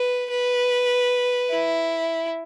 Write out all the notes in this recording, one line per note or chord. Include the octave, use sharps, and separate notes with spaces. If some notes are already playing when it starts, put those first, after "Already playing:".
Already playing: B4
B4
E4